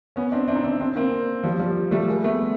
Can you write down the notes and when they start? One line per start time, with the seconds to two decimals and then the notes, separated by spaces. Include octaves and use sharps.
0.16 B3 C#4
0.32 C4 D4
0.48 C4 D4
0.56 D#4
0.64 C4 D4
0.80 C4 D4
0.96 A#3 C4
1.43 F3 G3
1.59 F3 G3
1.91 G3 A3
2.08 G#3 A#3
2.24 A3 B3